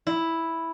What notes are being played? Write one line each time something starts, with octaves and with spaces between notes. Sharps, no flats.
E4